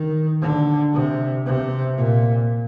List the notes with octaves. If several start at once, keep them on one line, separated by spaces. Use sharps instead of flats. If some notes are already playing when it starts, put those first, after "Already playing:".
Already playing: D#3
D3
C3
C3
A#2